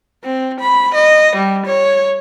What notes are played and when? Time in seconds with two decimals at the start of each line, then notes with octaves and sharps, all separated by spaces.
0.24 C4
0.60 B5
0.94 D#5
1.36 G3
1.66 C#5